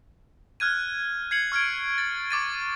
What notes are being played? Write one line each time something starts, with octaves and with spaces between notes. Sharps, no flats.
F6 F#6 G#6 D#7
G#6 C7 C#7 F#7
C#6 F6 G#6 D7
A6
C#6 D6 A6 D#7